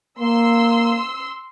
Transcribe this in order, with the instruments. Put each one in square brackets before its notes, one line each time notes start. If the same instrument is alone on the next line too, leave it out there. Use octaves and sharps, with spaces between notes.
[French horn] A#3 [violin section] C6 E6